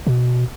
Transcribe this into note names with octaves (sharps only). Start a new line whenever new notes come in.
B2